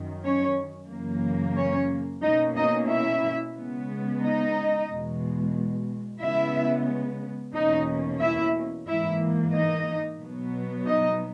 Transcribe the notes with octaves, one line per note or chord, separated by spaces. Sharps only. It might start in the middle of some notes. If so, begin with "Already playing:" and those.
Already playing: F#2 D#3
C#4 C#5
F#2 C#3 E3 A#3
C#4 C#5
B2 A#3 C#4 D#4 D#5
D#4 D#5
E4 E5
C#3 G#3 B3
D#4 D#5
E2 B2 G#3
C#3 G#3 B3 E4 E5
E2 B2 A#3 C#4 D#4 D#5
E4 E5
G#2 E3 A#3 E4 E5
D#4 D#5
B2 F#3 B3
D#4 D#5